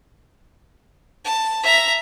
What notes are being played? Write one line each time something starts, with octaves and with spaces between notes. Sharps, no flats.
A5
E5 A#5